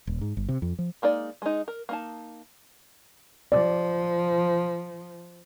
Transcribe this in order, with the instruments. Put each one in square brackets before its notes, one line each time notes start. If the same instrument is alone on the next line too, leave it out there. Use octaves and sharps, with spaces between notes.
[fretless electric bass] D#1
G#2
G1
C3
F2
F3
[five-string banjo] G#3 A#3 D#4 D5
G#3 D#4
A#4
A#3 D#4 A5
[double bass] F3 [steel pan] D5